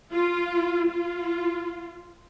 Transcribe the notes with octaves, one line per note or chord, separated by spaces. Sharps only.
F4
F4